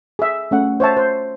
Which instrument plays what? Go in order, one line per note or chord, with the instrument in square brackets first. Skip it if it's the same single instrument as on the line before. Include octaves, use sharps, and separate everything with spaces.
[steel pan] G#4 E5
A3 C#4 F#5
C5 C#5 E5 A5
C5